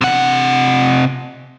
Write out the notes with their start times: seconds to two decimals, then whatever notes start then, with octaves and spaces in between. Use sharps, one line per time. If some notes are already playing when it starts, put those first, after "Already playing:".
0.01 C3 F#5